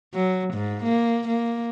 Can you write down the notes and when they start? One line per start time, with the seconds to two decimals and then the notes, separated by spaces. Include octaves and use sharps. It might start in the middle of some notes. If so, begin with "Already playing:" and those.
0.14 F#3
0.54 G#2
0.84 A#3
1.28 A#3